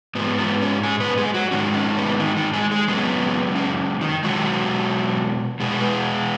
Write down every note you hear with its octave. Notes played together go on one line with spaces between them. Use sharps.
G#2 G#3 B3
B3
C#4
G#3 G#4
B3 B4
G#3 G#4
F#3 F#4
G#2 D#3 G#3 C#4
C#4
B3
D#3 D#4
D#3 D#4
G#3 G#4
G#3 G#4
F#2 C#3 G#3 B3
C#4
D#3 D#4
B2 F#3 G#3 F#4
B2 G#3 G#4
B4
G#3 G#4